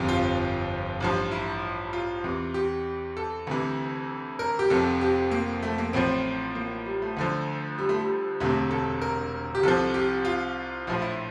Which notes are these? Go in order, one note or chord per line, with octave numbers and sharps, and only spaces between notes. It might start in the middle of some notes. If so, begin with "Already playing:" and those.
Already playing: G1 F2 C3
F4
A1 G2 F3
E4
F4
E2 C3 E3
G4
A4
D2 C3 E3
A#4
G4
F1 F2 C3 A4
G4
A#3
A3
A#3
A1 A2 F3 C4
A#3
G3
A3
D2 D3 F3
G3
A3
G3
E1 D2 C3 A3
A4
A#4
G4
C2 C3 F3 A4
G4
F4
A#1 A2 F3 F4
E4